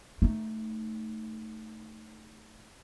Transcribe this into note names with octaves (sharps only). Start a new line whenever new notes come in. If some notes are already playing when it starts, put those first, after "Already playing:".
A3 D#4